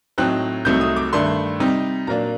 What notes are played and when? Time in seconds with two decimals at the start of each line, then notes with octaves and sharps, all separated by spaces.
0.18 A2 F#3 C4 D#4 F#6
0.65 C2 C3 F#3 A3 D#4 G6
0.81 D#6
0.96 D6
1.13 G2 D#3 A3 D4 C6
1.60 C3 G3 C4 D#4
2.07 A#2 F#3 A#3 D4 A#5